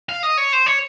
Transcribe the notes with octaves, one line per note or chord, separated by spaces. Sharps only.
F5
D#5
C#5
C5
C#5